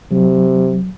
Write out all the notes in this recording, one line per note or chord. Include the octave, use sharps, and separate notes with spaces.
C3 F#3